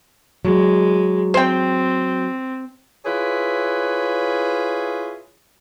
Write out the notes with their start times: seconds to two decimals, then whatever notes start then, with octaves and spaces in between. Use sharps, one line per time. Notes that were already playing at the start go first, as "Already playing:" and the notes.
0.45 F#3 G#3
1.34 C4 C5 G5
3.05 E4 F4 G#4 B4 C#5